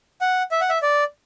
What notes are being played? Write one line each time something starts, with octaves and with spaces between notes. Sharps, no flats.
F#5
E5
F#5
E5
D5